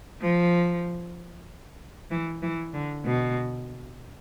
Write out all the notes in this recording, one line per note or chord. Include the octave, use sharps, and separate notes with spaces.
F3
E3
E3
D3
B2